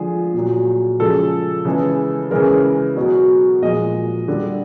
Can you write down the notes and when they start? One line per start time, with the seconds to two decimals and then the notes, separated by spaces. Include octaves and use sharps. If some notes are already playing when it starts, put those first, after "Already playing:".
Already playing: D3 F3 G#3 G#4
0.34 A#2 F#3
1.00 C#3 F3 G#3 A4
1.65 C#3 E3 G#3
2.31 C#3 E3 G#3 A#4
2.96 B2 F#3
3.62 A#2 F3 G#3 D#5
4.28 D3 G3